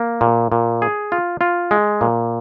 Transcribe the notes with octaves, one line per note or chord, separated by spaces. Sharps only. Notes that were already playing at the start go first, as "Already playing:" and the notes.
Already playing: A#3
A#2
A#2
G#4
F4
F4
G#3
A#2